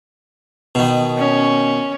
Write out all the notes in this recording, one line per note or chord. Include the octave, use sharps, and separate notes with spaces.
B2 D#3
C#4